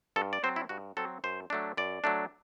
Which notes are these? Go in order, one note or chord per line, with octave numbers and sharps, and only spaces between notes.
G2 A4
D5
F#3 C4 C5
E4
G2 F#4
F#3 C4 A4
F#2 C5
F#3 A3 D4
F#2 D5
F#3 A3 D4